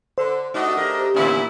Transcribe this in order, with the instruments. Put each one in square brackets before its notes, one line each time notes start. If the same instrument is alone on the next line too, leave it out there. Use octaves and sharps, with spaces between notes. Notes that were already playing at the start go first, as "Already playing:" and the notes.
[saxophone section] D3 [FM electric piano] C5
[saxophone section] A3 D4 D#5 [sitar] D#4 F#4
[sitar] G4 A#4
[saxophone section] A#2 E4 [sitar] D3 B3 C#4